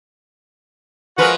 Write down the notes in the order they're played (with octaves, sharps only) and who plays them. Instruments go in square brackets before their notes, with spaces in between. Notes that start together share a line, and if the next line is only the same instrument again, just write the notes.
[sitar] F3 B4 [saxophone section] G#3 F#4 A#4